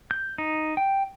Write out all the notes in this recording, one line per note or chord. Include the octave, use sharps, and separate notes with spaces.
G6
D#4
G5